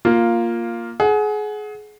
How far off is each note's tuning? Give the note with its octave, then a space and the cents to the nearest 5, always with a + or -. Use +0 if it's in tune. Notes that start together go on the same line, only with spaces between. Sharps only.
A#3 +0 F4 +0
G#4 +25 F#5 +0